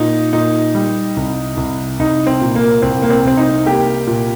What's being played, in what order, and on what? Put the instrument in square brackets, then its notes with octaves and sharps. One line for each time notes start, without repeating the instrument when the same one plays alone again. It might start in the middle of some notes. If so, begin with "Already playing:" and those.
Already playing: [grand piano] A#2 D#4
A#2 D#4
G3
C2
C2
C2 D#4
C4
A#2
A#3
C2 C4
A#3
C4
C2 C4
D#4
A#3 G4
A#2